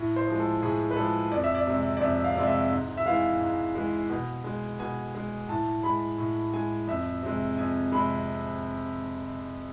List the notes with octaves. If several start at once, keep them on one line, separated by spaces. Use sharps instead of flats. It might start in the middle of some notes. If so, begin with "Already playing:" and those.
Already playing: A2
C5
F3 G#3
A4
A2 G#4
B4
F3 G#3 A4
F2 D5
E5
D5
C3 G#3
D5
F2 E5
F5
C3 G#3 D5
E5
G#2
E5
E3 G#3 F5
G#2
E3 G#3
B2
G#3
B2 G#5
G#3
A2 A5
G#3 B5
A2
G#3 G#5
F2 E5
C3 G#3
F2 G#5
C3 G#3 B5